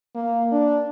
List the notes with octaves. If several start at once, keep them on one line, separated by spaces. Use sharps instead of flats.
A#3
D4